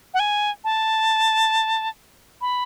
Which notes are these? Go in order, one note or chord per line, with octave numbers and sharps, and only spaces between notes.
F#5
G#5
A5
B5